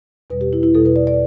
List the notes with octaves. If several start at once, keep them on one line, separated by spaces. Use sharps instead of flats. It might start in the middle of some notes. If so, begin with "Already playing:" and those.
E2 B2 G3 B4
G4
E4
E4
E2 B2 G3 A4
B4
D5
D5